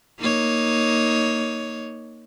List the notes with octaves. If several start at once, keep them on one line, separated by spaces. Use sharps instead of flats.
A#3 D#4 C#5